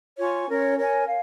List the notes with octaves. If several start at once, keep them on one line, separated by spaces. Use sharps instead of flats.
F4 C#5 G#5 C#6
C#4 A#4 C#5
A#4 C#5 G#5
F5